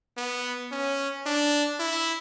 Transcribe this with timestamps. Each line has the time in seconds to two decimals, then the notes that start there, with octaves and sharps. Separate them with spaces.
0.17 B3
0.72 C#4
1.26 D4
1.80 E4